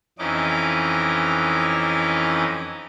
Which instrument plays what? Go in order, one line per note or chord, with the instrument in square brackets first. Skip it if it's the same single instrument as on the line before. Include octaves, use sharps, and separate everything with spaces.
[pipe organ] F2 E3 C#4 D#4 D#5 D6